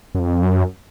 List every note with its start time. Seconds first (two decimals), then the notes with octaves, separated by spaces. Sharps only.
0.15 F#2
0.19 F2
0.43 F#2